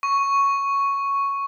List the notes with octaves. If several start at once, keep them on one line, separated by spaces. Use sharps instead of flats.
C#6